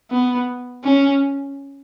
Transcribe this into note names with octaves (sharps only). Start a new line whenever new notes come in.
B3
C#4